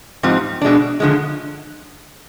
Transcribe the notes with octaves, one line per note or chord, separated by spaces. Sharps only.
G#2 F3 C4 D#4 G4
B2 G#3 D4
D3 F3 G#3